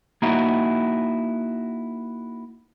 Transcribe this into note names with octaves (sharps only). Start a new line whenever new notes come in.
A#3 D#4 E4 F#4